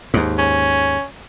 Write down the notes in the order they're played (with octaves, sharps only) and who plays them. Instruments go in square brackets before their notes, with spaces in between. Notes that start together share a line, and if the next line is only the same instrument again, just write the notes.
[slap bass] D#2 G#2
[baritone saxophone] C#4